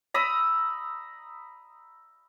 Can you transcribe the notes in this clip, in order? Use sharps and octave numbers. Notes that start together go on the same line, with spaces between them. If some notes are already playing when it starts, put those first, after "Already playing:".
A#5 B5 D#6 E6